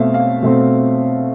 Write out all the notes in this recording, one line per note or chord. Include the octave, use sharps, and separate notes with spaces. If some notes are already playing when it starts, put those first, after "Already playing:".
Already playing: B2 A3 C4 E5 F5
F5
B2 A3 C4